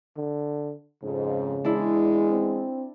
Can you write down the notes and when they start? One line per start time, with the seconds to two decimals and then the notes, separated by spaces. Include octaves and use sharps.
0.17 D3
1.04 F2 G#2 C#3
1.65 E2 G#3 D4 E4
2.30 C4